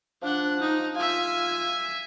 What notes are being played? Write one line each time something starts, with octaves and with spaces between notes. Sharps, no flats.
F3 D4 F#5
D#4
F4 E5 G#5